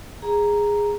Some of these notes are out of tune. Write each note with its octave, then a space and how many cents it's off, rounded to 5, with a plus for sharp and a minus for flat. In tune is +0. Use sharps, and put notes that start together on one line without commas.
G#4 -10 A#5 +0